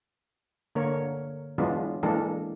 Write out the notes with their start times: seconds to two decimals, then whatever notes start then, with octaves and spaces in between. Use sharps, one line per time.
0.75 D3 A#3 A#4 C#5
1.58 E3 F#3 G#3 B3 D4 F4
2.03 E3 G#3 A#3 D4 A4